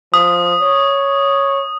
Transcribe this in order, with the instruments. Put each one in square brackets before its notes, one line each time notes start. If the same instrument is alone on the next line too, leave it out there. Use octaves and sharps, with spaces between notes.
[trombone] F3 [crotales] D#6
[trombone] C#5